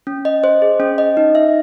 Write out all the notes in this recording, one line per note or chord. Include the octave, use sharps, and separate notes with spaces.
C#4
D#5
C5
G#4
C#4
D#5
D#4
E5